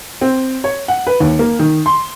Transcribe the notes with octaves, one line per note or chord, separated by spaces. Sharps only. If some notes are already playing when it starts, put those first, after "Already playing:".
C4
C#5
F#5
B4
D#2
A#3
D#3
C6